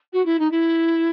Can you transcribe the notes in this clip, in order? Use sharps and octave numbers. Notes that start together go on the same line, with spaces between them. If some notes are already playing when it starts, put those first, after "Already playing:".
F#4
E4
D#4
E4